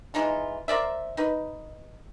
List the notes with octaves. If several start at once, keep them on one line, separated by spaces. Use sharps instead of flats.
E3 G#3 D#4 F4
A#4 C5 D5 E5
D#4 B4